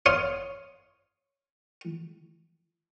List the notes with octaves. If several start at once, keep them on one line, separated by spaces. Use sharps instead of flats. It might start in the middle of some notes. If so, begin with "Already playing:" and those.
C#5 F5 C6 D#6